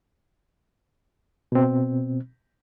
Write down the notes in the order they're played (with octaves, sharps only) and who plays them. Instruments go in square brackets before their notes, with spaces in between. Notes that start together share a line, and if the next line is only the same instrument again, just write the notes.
[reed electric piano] B2 C4